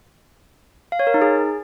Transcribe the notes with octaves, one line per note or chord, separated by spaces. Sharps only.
F5
C#5
A#4
D#4
G#4